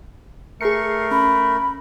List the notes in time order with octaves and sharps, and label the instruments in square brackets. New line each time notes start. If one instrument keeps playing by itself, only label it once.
[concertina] A3 A#4 [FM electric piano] G#4 C7 C#7
[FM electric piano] C#4 [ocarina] B5